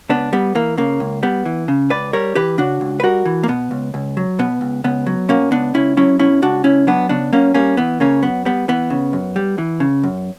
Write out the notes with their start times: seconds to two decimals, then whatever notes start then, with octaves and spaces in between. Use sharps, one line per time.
0.10 C#2 B3 D4
0.33 G3 B3
0.55 E3 A#3
0.77 C#3 A#3
1.00 C#2
1.23 G3 B3
1.45 E3
1.68 C#3
1.90 C#2 B4 D5
2.13 G3 A#4 C#5
2.35 E3 G4 B4
2.58 C#3 D4 F#4
2.81 C#2
3.00 B4
3.03 G3 F#4 A#4
3.25 E3
3.43 A#3
3.48 B2 B3
3.71 C#2
3.94 C#2
4.17 F#3
4.39 B2 B3
4.61 C#2
4.84 C#2 B3
5.07 F#3
5.28 B2 A#3 C#4
5.52 C#2 B3 D4
5.74 C#2 C#4 E4
5.97 F#3 C#4 E4
6.19 B2 C#4 E4
6.42 C#2 D4 F#4
6.64 C#2 C#4 E4
6.87 F#3 B3 D4
7.09 C#3 B3 D4
7.32 F#2 A#3 C#4
7.54 G3 A#3 C#4
7.77 E3 B3
8.00 C#3 A#3 C#4
8.22 F#2 B3
8.45 G3 B3
8.68 E3 B3
8.90 C#3
9.13 F#2
9.36 G3
9.58 E3
9.80 C#3
10.03 F#2